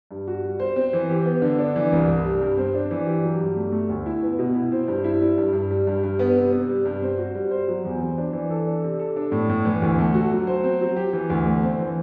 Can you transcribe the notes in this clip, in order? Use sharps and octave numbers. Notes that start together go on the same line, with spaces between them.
G2
F#4
G3
C5
C4
E3
G4
B3
D3
D4
E3
C2
C2
G3
G2
C4
D4
E3
G4
F#3
G2
A3
A3
D2
E4
B3
B2
E4
C4
G2
E4
G3
G2
G2
G3
G2
G2
B3
C3
C3
G3
G2
C4
F#4
G3
C5
F#3
E2
C4
D4
E3
A4
D4
C3
A4
D4
A2
A2
E3
D2
A3
F#4
F#3
C5
C4
F#3
G4
E3
D2
A3
C4
E3